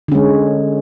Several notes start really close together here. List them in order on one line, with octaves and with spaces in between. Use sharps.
D3 C#4 G#3